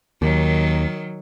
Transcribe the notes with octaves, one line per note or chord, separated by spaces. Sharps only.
D#2 D#3 F#3